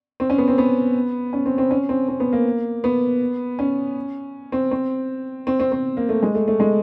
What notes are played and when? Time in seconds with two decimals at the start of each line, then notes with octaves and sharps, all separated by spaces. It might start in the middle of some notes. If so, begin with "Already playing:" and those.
0.20 C4
0.30 C#4
0.38 B3
0.48 C4
0.58 B3
1.33 C#4
1.46 C4
1.58 C4
1.71 C#4
1.89 C4
2.08 C4
2.20 B3
2.33 A#3
2.84 B3
3.59 C#4
4.52 C4
4.71 C4
5.47 C4
5.60 C4
5.72 C4
5.97 A#3
6.09 A3
6.23 G#3
6.35 A3
6.48 A3
6.60 G#3